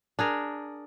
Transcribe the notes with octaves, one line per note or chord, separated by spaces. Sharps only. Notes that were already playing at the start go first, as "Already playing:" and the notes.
D4 G#4 A#4